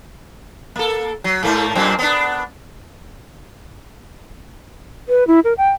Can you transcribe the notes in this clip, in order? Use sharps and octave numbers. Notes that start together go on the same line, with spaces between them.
A#3 A4
F#3
G#2 A3 A#3
F#2 A#2 C4
B3 D4
B4
E4
A#4
G5